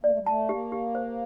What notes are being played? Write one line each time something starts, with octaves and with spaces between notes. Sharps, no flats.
A#3 D5
A3
G3
A3 A5
A#3 G4
G4
C5